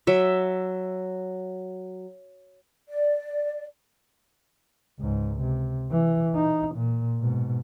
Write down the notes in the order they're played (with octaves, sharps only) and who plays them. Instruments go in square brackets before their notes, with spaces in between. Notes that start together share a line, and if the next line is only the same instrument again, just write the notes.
[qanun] F#3 E5
[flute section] D5
[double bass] C#2 G#2
C3
E3
D#4
A#2
G#2 B2